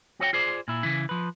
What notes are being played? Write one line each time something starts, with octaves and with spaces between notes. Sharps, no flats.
F#4 C#5 D#5 G5
F4 G#4 C5 D5
A#2 E4
C#3 E3 E4
F3 B4